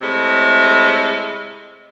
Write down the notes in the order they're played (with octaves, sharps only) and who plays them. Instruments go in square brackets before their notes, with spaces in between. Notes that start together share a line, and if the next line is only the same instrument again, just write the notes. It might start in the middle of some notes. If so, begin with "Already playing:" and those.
[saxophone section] A2 C3 G#3